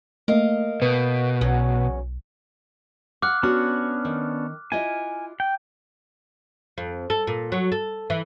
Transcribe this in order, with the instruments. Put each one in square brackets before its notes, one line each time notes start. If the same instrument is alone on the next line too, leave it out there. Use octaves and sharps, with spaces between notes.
[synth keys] A3 A#3 [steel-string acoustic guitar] A#4 D#5 F5
[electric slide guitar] B2 [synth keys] B4 G6
[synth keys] B1 [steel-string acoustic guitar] E2 F#3 C#4
[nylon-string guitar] F5 F#5 [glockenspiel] D6 F6 F#6
[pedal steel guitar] B3 C#4 D4 [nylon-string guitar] F#4
[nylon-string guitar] D#3
[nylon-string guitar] E4 F4 D#5 [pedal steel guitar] G#5
[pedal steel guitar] G5
[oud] F2
A4
A#2
F#3
A4
E3